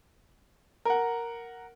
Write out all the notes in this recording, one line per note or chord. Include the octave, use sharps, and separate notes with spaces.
A#4 F#5